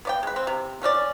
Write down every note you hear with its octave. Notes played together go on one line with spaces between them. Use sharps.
B3 D5 G5
G#3 B4
C4
C3
B2 C#4 D4 D5